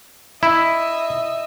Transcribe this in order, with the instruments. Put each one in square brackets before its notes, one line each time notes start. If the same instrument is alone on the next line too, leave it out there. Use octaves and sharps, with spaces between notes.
[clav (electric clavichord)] E4 [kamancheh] D#5 E5